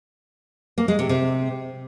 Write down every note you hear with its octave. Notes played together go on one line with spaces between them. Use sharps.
A#3
G#3
C3
C3